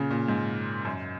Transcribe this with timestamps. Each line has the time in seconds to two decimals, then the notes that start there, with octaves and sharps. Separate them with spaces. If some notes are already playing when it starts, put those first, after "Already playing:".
Already playing: A#2 C#3
0.10 A#2
0.28 G#2
0.85 F#2